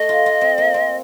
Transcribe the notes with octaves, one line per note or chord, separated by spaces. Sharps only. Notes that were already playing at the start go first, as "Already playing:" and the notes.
Already playing: A3 D#5
F4
F4
C4
A#3
C4